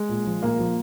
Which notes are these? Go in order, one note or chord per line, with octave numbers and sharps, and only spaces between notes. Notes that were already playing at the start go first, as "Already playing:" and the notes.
Already playing: G#3
A#2
F3
A#2 A#3
F3